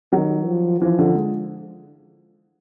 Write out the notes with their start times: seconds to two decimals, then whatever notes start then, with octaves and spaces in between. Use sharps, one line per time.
0.12 D#3 F#3
0.46 F3
0.81 E3 F3
0.99 D3
1.15 G#3